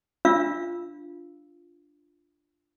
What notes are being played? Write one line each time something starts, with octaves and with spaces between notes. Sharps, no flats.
D4 F4 F5 E6